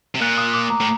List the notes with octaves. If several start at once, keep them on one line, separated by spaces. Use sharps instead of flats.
C3
A#2 F#6
D#6
D6
A#5
A2